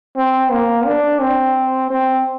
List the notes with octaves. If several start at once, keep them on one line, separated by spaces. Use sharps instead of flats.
C4
A#3
D4
C4
C4